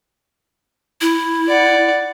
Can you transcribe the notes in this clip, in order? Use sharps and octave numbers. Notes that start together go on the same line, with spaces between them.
E4
D5 F#5